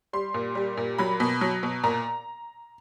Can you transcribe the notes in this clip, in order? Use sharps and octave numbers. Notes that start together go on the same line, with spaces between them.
G3 C6
A#2
G3
A#2
F#3 B5
B2
F#3
B2
A#2 A#5